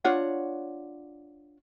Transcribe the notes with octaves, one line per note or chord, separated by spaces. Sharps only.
D4 F4 C#5 F#5